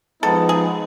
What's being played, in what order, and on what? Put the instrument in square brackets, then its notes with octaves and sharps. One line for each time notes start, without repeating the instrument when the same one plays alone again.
[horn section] F3 G#3 B3 D#4 [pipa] A4
[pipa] G#4